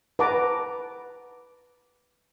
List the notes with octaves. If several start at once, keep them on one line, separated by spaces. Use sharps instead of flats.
B4 F#5 A5 A#5 D6